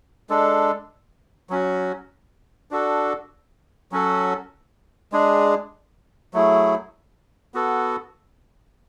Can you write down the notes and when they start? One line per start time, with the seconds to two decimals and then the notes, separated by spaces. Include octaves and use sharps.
0.29 G#3 D4 A4
1.50 F#3 C#4 F#4
2.71 D4 F#4 A4
3.92 F#3 C#4 F#4 A4
5.12 G#3 D4 G#4
6.33 F#3 A3 E4 G#4
7.54 B3 F#4 A4